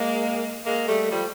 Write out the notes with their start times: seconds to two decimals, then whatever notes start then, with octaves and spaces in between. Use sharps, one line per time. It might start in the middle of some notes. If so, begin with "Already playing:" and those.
Already playing: G#3 A#3
0.66 G#3 A#3
0.88 G3 A3
1.11 F3 G3